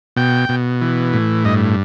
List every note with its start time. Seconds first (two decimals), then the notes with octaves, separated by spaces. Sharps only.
0.16 B2 G5
0.49 B2
0.82 E3
1.13 A2
1.45 G2 D#5